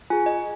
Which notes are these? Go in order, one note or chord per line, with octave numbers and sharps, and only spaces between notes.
F4 G#4 G#5
D#5